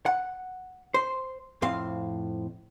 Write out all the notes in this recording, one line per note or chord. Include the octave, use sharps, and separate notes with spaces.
F#5
C5
F2 A2 C4 F5